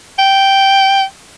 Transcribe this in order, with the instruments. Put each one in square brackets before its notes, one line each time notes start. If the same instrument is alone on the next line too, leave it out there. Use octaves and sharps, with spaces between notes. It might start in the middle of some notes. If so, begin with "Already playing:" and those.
[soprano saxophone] G5